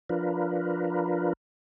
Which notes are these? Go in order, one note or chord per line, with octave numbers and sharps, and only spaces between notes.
F3 D4 F4 A#4 B4